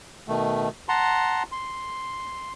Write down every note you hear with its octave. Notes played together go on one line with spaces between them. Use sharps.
B2 D#3 A3
F#5 A5 A#5 C6
C6